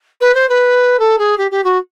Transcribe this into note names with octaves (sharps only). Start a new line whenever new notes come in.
B4
C5
B4
A4
G#4
G4
G4
F#4